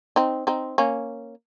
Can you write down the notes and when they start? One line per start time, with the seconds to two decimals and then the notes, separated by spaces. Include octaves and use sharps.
0.16 C4 D#4
0.47 C4 D#4
0.78 A#3 C#4